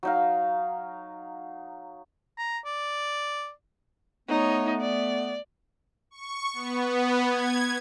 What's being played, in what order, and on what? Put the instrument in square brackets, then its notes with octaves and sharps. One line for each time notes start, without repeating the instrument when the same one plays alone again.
[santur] F#3 D#4 F5
[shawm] A#5
D5
[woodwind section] A3 B3 [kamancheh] D#4 C#5
[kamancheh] D5
[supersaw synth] C#6
B3
G#6